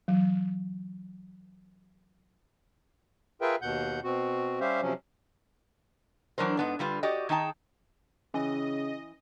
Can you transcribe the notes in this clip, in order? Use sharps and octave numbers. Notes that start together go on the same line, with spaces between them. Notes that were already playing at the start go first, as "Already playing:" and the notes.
E3 F#3
F4 G#4 A#4 B4 E5 G5
D#2 B2 F#5 G6
B2 C4 F#4
G3 C#4 G4 C5 E5 F5
C3 F3 F#3 C#4
E3 F#3 D4 A#4 C5
G#2 B3 D4
D3 G3 F4 B4
F#4 G4 D5 D#5
D#3 D#4 G#4 G5 A5
C#3 E3 C#4 D#5